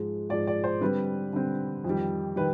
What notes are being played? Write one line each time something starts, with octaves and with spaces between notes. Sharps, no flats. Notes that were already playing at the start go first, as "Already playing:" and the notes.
Already playing: G#2 F3 G#3
G#2 F3 G#3 D5
D5
C5
D3 G3 C4 B4
D3 G3 C4
F2 D#3 G3
D#3 G3 B4